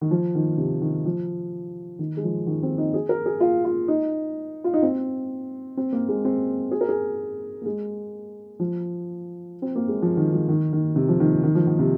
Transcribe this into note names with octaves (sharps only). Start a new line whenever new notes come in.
D#3
F3
D#3
C3
D#3
F3
D#3
G#3
F3
D#3
C4
D#4
G#4
A#4
G#4
F4
F4
D#4
F4
D#4
C4
C4
A#3
G#3
C4
G#4
A#4
G#4
A#3
G#3
F3
C4
A#3
G#3
F3
D#3
F3
D#3
D#3
C3
F3
D#3
D#3
F3
D#3
C3